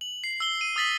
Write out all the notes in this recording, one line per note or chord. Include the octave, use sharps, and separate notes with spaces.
F#7
C7
E6 G7
D#7
D#6 E6 A6 B6 F#7